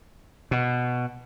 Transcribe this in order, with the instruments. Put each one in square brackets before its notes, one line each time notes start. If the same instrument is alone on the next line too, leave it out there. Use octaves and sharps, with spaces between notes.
[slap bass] B2